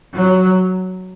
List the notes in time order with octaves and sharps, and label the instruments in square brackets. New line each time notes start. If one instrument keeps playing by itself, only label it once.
[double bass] F#3